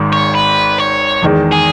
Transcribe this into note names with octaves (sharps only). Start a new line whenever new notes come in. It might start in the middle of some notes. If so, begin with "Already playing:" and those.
Already playing: G#1 G#2 D#3
C#5
B4
C#5
E2 D#3 G#3
G#4